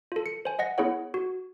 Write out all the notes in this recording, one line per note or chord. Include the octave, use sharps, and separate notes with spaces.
F4 A4
C#7
C5 G#5
D#5 F#5 A#6
B3 E4 G#4 C#5 F#5
F#4